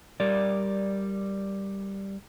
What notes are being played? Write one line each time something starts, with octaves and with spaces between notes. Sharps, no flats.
G3 A#4 D5